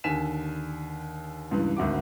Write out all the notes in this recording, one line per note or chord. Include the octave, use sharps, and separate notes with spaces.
D#2 D3 G#5 B6 E7
C#2 G2 E3
G#1 D2 F#4 D6